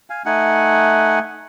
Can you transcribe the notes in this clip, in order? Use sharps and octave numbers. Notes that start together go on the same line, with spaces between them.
F5 G#5
A3 D#4 F#5 G#5